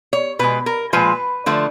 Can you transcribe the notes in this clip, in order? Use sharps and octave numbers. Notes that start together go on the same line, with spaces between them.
C#5
B2 G#3 B4
A#4
A#2 F3 G#3 B4
D3 F3 A3